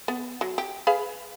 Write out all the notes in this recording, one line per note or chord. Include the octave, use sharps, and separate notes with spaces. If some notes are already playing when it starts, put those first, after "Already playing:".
B3
F#3
G4
G#4 B4 F5